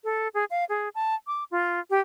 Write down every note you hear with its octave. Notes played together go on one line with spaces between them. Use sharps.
A4
G#4
F5
G#4
A5
D6
F4
G4